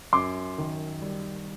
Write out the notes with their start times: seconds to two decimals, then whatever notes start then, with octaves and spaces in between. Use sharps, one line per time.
0.13 F#2 C6 D6
0.58 D#3
1.02 G3